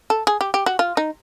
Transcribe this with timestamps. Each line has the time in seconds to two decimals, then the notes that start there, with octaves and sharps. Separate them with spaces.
0.10 A4
0.27 G#4
0.41 G4
0.54 G4
0.66 F#4
0.79 F4
0.97 D#4